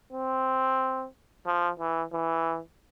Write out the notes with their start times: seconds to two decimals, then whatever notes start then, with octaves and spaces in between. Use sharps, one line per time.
0.13 C4
1.46 F3
1.80 E3
2.13 E3